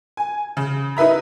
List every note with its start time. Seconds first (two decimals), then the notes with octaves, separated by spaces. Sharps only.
0.17 G#5
0.57 C#3
0.97 D#4 E4 B4 E5 A#5